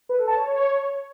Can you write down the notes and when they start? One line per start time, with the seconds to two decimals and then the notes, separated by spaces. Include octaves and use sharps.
0.09 B4
0.18 A4
0.28 A5
0.37 C#5